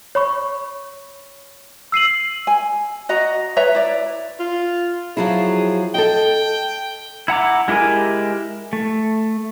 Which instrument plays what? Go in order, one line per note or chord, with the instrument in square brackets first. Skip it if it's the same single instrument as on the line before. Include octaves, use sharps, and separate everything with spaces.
[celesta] C#5 B5 C#6
E6 C7 D#7 F#7
[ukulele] G#5
F#4 D#5 A#5
B4 C#5 E5 A#5
E4 D5
[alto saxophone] F4
[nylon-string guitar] F3 F#3 E4 [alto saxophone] G#4
[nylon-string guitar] A4 D#5 [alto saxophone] G5
[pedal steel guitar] E4 F#5 A#5 D6
G#3 E4 G4 A#4 G#5
A3